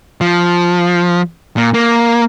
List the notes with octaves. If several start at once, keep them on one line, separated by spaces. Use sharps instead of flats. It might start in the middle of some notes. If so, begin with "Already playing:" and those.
F3
A#2
A#3